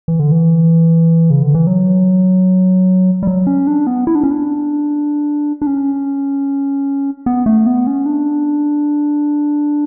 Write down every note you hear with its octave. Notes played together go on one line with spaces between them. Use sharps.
E3
D3
E3
C#3
D3
E3
F#3
G3
F#3
C#4
D4
B3
E4
D4
C#4
D4
D4
C#4
B3
A3
B3
C#4
D4